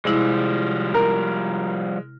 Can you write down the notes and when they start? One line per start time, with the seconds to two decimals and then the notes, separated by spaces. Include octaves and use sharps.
0.05 C3 F3 G3 G#3 E4
0.94 A#4